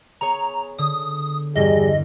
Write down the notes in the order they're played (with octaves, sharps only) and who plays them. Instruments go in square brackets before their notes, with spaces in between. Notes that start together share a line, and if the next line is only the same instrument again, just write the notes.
[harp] B3 G#4 C#5 [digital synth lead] A#5
[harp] D3 [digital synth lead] D#6
[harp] E2 G2 D3 [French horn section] G3 G#4 [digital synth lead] D#5